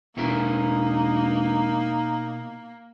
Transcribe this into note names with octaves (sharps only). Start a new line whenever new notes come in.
E1 B2 A#3 D#4 E4 A#4